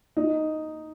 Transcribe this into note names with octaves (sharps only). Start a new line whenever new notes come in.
D#4